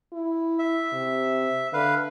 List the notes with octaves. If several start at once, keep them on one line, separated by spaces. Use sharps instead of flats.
E4
E5
C3
D3 B4 F5